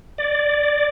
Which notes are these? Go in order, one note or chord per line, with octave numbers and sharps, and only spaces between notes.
D5